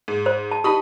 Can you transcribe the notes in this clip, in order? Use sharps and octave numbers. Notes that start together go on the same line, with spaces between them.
G#2
C5
A5
D#4 G4 A5 B5 D#6